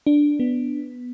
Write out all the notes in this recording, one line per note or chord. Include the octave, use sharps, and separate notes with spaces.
D4
B3